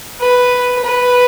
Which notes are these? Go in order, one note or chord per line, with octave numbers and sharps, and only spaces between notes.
B4
B4